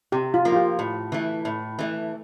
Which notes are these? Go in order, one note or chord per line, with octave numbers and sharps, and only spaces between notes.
C3 G4
F4
F3 A#3
F4
G4
A2
E3 A3
A2
E3 A3